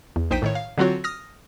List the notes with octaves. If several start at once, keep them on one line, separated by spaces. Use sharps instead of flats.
E2
A#1 D#4 C5 G5 B6 D#7
A2 D#3 C#5
F5
D3 F#3 C4 F4 F#4 C#5
D#6 F6 A#6